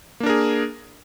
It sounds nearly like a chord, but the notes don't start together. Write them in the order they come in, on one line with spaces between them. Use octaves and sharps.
A#3 D4 A#4 G#4